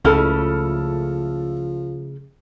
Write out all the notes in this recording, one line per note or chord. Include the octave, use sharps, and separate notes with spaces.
C#2 C#3 F3 A3 E4 A4 F6